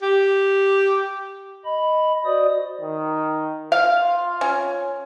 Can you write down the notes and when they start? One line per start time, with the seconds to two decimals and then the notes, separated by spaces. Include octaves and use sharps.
0.02 G4
1.65 D#5 B5
2.25 F#4 C5 D5 D#5 D#6
2.81 D#3
3.72 F4 F5
4.41 C#4